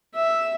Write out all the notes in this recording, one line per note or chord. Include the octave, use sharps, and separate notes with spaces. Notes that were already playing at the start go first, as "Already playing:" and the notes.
E5